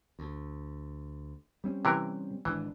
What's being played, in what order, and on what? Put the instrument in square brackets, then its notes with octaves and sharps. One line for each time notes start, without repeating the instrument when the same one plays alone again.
[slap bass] D2
G3 C4 C#4
[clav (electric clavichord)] C3 E3 A#4
[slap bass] G#1 D4 [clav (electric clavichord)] E3